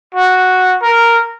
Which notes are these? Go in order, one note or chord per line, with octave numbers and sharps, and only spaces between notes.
F#4
A#4